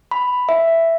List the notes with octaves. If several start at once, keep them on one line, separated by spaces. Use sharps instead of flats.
B5
E5